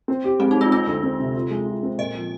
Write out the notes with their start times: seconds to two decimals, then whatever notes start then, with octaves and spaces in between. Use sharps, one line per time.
0.08 C4
0.24 G4
0.39 G#3 C4
0.51 D#4
0.56 G#3 F4
0.71 C4 F4
0.87 D2
1.03 C4
1.20 C3
1.35 F4
1.50 G#3
1.66 F4
1.83 C4
1.98 A#2 D#5
2.14 F3